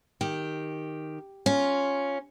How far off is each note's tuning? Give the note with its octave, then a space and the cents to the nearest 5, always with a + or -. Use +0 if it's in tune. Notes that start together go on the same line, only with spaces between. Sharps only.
D#3 +0 G4 +0
C#4 +0 F4 +0